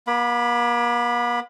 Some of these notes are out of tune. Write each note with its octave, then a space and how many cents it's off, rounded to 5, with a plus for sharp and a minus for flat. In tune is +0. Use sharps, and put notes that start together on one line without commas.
A#3 +45 B5 +0